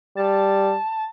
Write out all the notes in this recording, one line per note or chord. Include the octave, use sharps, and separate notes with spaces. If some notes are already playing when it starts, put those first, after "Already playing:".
G3 A5